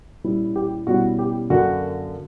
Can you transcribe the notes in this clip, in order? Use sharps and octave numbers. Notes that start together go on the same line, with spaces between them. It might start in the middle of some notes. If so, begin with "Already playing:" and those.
A#2 G3 C#4 E4
G4
B2 G3 C#4 E4 F#4
G4
F#2 D3 A#3 F#4